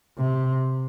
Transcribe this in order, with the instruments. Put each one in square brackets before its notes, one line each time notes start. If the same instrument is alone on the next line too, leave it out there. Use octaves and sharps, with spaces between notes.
[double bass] C3